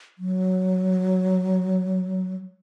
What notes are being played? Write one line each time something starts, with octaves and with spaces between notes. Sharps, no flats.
F#3